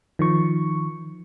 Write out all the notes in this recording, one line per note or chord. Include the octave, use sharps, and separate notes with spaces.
D#3 F3 C#6